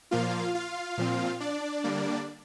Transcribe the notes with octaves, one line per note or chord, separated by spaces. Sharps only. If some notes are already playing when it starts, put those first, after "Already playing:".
A#2 F3 A#3 F4 F5
F4 F5
A#2 F3 C4
D4 D5
D3 G3 A#3